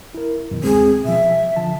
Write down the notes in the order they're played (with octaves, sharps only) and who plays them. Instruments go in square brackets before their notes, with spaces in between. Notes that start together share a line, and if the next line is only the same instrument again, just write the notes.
[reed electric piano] E4 A#4
F#2 B2 D#3
[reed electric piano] D2 G#3 C4 [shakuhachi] G#4
[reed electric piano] B2 F3 [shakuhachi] E5
[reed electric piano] D3 F3 A5